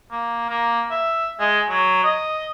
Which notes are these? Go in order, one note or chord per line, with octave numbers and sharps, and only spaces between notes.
A#3
A#3
E5
G#3
F#3
D#5